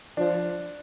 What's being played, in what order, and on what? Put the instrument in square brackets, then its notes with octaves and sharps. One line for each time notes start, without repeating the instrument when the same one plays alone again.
[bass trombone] F3 [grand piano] D4